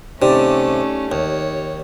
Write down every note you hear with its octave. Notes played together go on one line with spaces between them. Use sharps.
C3 A3 C#4 D#4 G4 D5
D#2 C#5